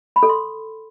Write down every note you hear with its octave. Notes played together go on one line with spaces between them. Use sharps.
B5
A4
C6